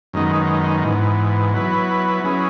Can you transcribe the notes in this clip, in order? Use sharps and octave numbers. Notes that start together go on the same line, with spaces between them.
F#2 D#3 G#3 B3 D#4
G#2 E3 B3
F#3 B3 E4 B4
F#3 C#4 E4 G#4 B4